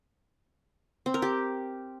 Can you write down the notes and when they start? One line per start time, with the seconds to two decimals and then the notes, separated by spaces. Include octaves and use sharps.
1.06 C4
1.14 A#4
1.22 G4